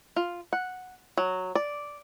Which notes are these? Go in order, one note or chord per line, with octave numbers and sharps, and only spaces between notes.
F4
F#5
F#3
D5